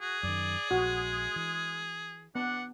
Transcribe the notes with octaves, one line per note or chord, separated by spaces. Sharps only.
F#4 G#4
F#2 D#3 D5
A#1 G#3 F#4
E3
B3 D4 F#5